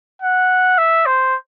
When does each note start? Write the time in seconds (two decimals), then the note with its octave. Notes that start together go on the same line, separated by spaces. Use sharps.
0.22 F#5
0.78 E5
1.06 C5